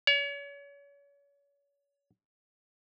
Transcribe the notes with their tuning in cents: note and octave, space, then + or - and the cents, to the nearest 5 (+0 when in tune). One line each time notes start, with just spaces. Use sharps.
C#5 +35